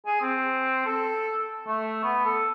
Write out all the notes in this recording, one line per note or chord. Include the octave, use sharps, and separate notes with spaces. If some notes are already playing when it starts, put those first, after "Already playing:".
G#4
C4
A4
A3
B3
A4